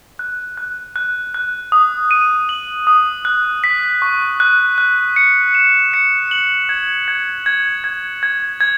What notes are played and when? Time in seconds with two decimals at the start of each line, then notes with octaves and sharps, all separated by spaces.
0.19 F#6
0.58 F#6
0.96 F#6
1.34 F#6
1.72 D#6
2.11 D#7
2.49 F#7
2.87 D#6
3.25 F#6
3.64 B6
4.02 C#6
4.40 F#6
4.78 F#6
5.16 C#7
5.55 E7
5.94 C#7
6.31 F#7
6.69 G#6
7.08 G#6
7.46 G#6
7.84 G#6
8.23 G#6
8.60 G#6